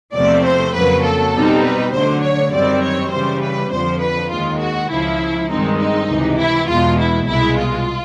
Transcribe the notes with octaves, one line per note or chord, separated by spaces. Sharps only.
E2 C3 F3 A3 C4 D5
C5
F2 C#3 F#3 A#3 B4
A4
B2 G3 C4 D#4
B4
D2 D3 F#3 C5
C#5
F#2 D#3 G3 C4 D5
C#5
C#3 E3 G3 C5
B4
F2 D3 F3 C5
B4
D#2 D#3 G#3 F4
F#4
C#2 C#3 F3 E4
G2 D#3 G#3 C4 D#4
D#4
C#2 C3 E3
E4
E2 B2 G#3 F4
E4
C2 B2 G#3 E4
F4